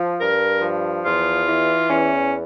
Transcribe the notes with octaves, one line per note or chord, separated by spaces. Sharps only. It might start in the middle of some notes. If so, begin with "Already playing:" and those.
Already playing: F3
G2 A#4
F3
E2 F4
E3
E2 C#4